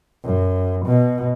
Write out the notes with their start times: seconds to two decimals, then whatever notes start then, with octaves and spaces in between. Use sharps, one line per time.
0.24 F#2
0.86 B2